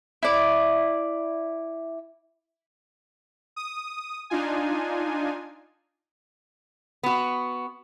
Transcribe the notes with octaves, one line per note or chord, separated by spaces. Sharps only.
E4 D5
D#6
D4 D#4 F4 G#5
B3 F#4